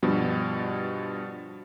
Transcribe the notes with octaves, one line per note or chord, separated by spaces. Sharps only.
G2 B2 F3